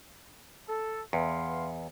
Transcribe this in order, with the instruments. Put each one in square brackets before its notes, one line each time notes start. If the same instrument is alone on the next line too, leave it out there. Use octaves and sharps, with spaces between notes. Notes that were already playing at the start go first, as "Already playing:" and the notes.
[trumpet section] A4
[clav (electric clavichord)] E2 [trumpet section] B4 F5 C6